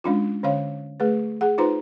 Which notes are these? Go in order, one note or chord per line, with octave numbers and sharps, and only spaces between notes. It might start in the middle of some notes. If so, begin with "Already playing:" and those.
G#3 C#4 D4 F4
D3 C#4 C#5 F5
A3 G#4 B4
G#4 F#5
D#4 F4 B4 C5 A#5 C6